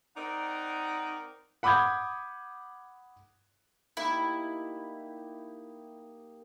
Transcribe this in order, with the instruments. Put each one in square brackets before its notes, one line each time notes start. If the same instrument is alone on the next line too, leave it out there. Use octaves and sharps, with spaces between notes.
[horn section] C4 D#4 A#4 D5 D#5 F#5
[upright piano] F#5 B5 D6 D#6 G6 G#6
[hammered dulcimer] A#3 D#4 G4 [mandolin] E4